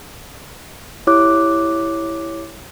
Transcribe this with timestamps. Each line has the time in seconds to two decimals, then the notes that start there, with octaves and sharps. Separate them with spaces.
1.07 E4 G4 C#5 D6 F#6